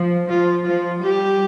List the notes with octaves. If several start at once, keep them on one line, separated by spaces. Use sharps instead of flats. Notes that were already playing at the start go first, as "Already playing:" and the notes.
Already playing: F3
F3 F4
F3 F4
G3 G4